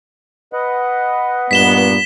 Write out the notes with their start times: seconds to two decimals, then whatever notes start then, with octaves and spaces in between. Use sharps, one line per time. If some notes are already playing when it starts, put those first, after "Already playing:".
0.53 B4 D#5 F#5
1.51 G2 A#2 B3 B6 E7 G7